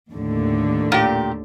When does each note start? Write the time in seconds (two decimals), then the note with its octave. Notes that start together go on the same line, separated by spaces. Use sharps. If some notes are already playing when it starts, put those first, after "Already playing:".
0.12 D#2 A2 D3
0.92 A#2 G4